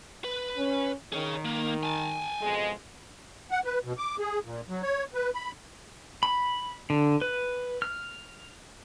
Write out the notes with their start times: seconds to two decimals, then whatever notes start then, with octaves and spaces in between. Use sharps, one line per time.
0.24 B4
0.56 C#4
1.12 D#3 G#4 C#5
1.45 A#3
1.83 G#5 A5
2.42 F2 B2 G#3
3.51 F#5
3.65 B4
3.84 B2
3.98 D6
4.19 G#4
4.45 A#2
4.69 F#3
4.83 C#5
5.14 B4
5.34 B5
6.23 B5
6.90 D3
7.21 B4
7.82 F6